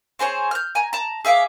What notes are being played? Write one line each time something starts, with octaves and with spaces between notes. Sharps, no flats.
C4 G#4 C5 C#5
F6 G6
G#5 A#5
A5 A#5
G#4 E5 F5 D6